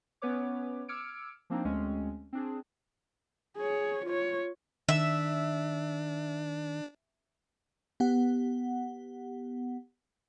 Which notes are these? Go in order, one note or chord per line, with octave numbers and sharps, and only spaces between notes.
B3 C#4 B4 C#5 D6
D6 E6 F6 G#6 C#7 D7
F3 A#3 C4 D4 D#4
D2 G#3 C4 C#4
C4 D4 G#4
G#4 C#5
F4 C#5
D#3 D4 E5
B3 G4 F#5